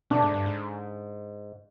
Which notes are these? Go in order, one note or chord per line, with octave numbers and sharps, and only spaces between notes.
B2 D4
G#2
G2
G#2